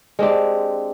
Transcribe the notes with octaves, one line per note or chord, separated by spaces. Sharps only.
G#3 C4 D4 G4